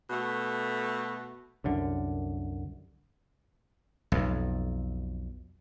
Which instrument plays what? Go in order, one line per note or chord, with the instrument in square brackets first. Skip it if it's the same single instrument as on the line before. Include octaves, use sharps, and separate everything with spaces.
[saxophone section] B2 A3
[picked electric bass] C2 F#2 D3
[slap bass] B1 F2